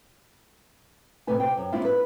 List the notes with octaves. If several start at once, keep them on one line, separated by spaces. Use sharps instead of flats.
G#2 C3 A3 B4 G#5
C3 G5
F#2
G#3 A#3 C4 D4 E4 F4
B4